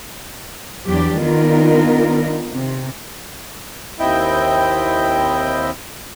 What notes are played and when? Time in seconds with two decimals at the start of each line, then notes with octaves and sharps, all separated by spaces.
0.88 E2 F#3 D4 G4
1.21 D#3 B3 D4 D#4 F4 A#4
2.51 C3
3.99 D#2 C4 E4 D#5 E5 G5